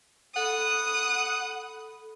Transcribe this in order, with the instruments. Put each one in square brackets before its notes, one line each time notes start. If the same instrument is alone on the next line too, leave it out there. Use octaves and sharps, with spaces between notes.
[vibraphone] A4 B5 [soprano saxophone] F#5 [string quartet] D#6